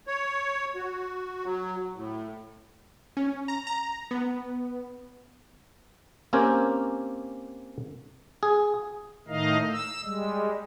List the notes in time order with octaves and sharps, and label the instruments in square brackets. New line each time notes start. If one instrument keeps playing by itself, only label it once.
[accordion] C#5
F#4
F#3
A2
[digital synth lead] C#4
A#5
A#5
B3
[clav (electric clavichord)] A#3 C4 C#4 G4 A#4 G#5
G#4
[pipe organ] A2 D#3 A3 D#4 D#5 F5
E6
G3 G#3